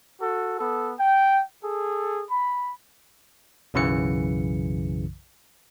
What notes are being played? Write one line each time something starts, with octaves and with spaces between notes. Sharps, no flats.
F#4 A4
B3 A4
G5
G#4 A4
B5
B1 F#2 C#3 E3 C#7